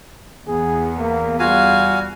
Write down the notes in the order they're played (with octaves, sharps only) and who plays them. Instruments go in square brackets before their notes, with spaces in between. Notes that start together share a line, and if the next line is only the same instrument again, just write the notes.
[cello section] E2 [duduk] B3 [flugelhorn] G#4
[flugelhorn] A#3
[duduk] G3 [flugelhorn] F4 [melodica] F#4 F5 G#5